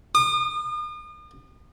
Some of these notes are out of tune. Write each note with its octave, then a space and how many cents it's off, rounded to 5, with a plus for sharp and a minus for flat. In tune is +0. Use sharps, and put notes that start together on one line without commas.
D#6 -40